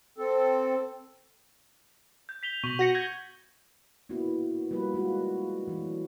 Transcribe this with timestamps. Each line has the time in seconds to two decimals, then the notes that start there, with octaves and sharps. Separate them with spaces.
0.18 C4 A4
2.29 G6
2.43 B6 F7 G7
2.64 B2 C#6 F#7
2.79 F#4 A#6 C#7
2.94 G6 G#6 A#6
4.09 A#3 B3 D4 E4 F#4
4.70 F3 G3 A#3 F4 F#4 B4
4.94 G#3 D4 F4 F#4
5.67 E3 F#3 A3 A#3 D4